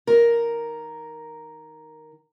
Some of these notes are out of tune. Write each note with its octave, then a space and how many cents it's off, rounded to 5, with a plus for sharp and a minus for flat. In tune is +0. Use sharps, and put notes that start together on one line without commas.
D#3 +0 A#4 +0